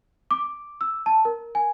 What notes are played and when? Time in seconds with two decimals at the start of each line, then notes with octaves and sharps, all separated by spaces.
0.31 D6
0.81 E6
1.06 A5
1.25 A#4
1.55 G#5